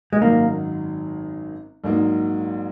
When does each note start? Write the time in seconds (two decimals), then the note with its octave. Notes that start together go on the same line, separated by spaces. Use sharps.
0.13 G#3
0.21 G#1 F#2 D#3 F#3 A#3 D#4
1.84 A#1 G#2 F#3 A#3 D#4